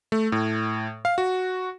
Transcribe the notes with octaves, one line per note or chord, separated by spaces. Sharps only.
A3
A2
F5
F#4